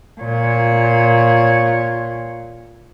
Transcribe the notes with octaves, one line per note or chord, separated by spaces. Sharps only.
A#2 C#5